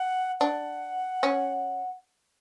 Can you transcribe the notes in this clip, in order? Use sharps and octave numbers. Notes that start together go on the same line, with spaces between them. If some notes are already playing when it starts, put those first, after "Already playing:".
Already playing: F#5
D4 F#5
C#4